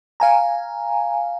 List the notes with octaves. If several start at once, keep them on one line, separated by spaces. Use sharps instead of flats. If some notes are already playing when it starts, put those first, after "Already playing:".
F5 G#5 A#5